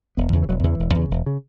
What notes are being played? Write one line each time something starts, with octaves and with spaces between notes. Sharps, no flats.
E1 B3
E2 C#3
E3
E1 F#3
E2 C#3 E3
E1
E2 C#3
E1
C#3